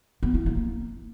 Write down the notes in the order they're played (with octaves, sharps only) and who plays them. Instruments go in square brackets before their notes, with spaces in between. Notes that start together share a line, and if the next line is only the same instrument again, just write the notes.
[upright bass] B3
E4
A#3